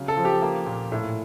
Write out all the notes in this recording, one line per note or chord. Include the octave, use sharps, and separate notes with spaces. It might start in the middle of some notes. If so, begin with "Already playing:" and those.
Already playing: C#3 F#3
A4
F3
G4
A#3
A#2
A2